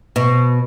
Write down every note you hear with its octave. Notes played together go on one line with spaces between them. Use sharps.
B2